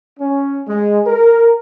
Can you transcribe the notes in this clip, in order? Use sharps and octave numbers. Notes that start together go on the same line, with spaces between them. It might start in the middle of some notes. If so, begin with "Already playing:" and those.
C#4
G#3
A#4